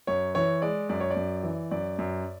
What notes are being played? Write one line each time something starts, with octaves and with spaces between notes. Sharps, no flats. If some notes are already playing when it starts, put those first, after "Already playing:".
F#2 C#5
E3 C#5
G#3 D5
F#2 D5
C#5
D5
F#2
E3
F#2 D5
F#2